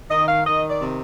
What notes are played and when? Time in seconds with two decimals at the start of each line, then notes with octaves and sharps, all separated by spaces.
0.10 D#3 D#5
0.28 F5
0.46 D#3 D#5
0.69 D5
0.81 C3